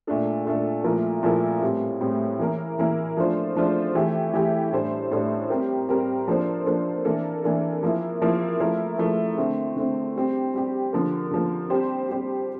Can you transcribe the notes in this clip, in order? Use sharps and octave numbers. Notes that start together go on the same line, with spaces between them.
A#2 A3 D4 A4
A#2 A3 D4 A4
A#2 F3 A3 E4 A#4
A#2 F3 A3 E4 A#4
A2 G3 C4
A2 G3 C4
E3 A#3 E4 A#4
E3 A#3 E4 A#4
F3 A3 D4 F4 C5
F3 A3 D4 F4 C5
E3 A3 E4 G4
E3 A3 E4 G4
A2 G3 D4 A4 C5
A2 G3 D4 A4 C5
G3 C4 G4 A#4
G3 C4 G4 A#4
F3 A#3 D4 A4 C5
F3 A#3 D4 A4 C5
E3 A#3 D4 A4
E3 A#3 D4 A4
F3 A#3 E4
F3 A#3 E4
F3 A3 E4 A#4
F3 A3 E4 A#4
D3 A3 C4
D3 A3 C4
G3 C4 G4
G3 C4 G4
D3 F3 A#3
D3 F3 A#3
G3 C4 G4 C5
G3 C4 G4 C5